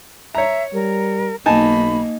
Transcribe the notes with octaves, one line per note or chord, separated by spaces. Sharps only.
C#5 E5 A#5
G3 A#4
B1 A#3 D#4 G#5 A5 B5